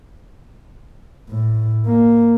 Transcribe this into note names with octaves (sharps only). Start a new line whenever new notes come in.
A2
A#3